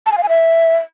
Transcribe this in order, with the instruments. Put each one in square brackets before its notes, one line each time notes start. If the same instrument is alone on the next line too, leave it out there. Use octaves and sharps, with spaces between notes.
[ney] A5
G#5
F5
G#5
E5